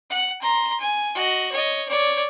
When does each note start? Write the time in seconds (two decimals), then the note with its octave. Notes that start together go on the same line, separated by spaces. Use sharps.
0.10 F#5
0.42 A#5 C6
0.80 G#5
1.15 F#4 D#5
1.52 C#5 D#5
1.89 C#5 D5